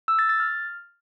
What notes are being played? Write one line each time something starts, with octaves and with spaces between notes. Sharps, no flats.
E6
A6
A6
F6